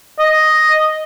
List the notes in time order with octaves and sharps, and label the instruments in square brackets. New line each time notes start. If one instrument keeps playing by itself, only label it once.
[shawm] D#5